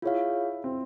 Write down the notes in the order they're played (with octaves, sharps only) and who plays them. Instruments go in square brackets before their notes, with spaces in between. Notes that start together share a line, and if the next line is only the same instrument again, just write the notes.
[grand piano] E4 [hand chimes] F4 G#4 C#5 F5
[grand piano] C4